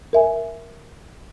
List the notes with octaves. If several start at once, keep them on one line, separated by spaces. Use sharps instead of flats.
A#4 E5 G#5